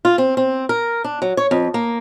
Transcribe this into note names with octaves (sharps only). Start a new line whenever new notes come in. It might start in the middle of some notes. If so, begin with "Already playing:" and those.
F4
C4
C4
A#4
D4
F#3
C#5
F2
A#3